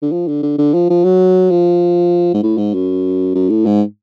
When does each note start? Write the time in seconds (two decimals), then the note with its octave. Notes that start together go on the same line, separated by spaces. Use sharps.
0.02 D3
0.12 F3
0.28 D3
0.43 D3
0.58 D3
0.74 F3
0.90 F3
1.04 F#3
1.51 F3
2.34 G#2
2.43 A2
2.58 G#2
2.74 F#2
3.35 F#2
3.50 A2
3.66 G#2